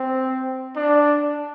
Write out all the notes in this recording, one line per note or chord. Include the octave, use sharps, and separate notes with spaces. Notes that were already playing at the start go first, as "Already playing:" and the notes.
Already playing: C4
D4